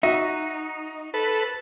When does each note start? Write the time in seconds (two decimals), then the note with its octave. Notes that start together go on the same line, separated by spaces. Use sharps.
0.03 D#4 F#4 E5
1.14 A4 B4